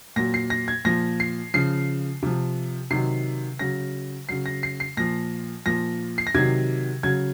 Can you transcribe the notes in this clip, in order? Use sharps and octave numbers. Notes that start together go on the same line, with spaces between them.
A#2 F#3 A#6
C7
A#6
G#6
A#2 F3 A#6
C7
C#3 F3 C7
C3 F3
C3 D#3 F#3 C7
C#3 F#3 A#6
C#3 F#3 C7
A#6
C7
C7
A#2 F3 A#6
A#2 F3 A#6
C7
A#6
C3 D#3 F#3 G#6
C#3 F#3 G#6